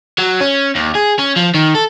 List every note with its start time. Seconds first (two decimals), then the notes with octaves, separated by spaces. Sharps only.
0.18 F#3
0.40 C#4
0.75 D#2
0.95 G#4
1.19 C#4
1.36 F3
1.54 D#3
1.75 A4